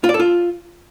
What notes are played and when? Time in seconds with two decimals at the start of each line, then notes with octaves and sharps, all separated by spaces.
0.04 F4
0.09 D5
0.14 A4
0.20 F4